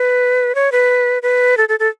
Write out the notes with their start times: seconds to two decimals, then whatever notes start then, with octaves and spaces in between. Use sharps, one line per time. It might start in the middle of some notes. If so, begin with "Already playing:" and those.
Already playing: B4
0.55 C#5
0.72 B4
1.23 B4
1.57 A4
1.69 A4
1.80 A4